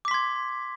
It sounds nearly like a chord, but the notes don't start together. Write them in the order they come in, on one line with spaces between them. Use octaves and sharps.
D6 B6 C6 G#6